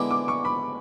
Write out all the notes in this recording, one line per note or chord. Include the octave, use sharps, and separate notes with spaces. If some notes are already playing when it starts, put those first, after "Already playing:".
Already playing: D3 G#3 B3 E4 D6
D6
C#6
B5